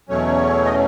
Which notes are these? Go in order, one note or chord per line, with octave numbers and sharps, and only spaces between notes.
E2 B2 F#3 A3 C#4 C#5
D#5